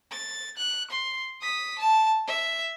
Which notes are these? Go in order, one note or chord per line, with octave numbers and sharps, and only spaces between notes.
A6
F#6
C6
D#6 B6
A5
E5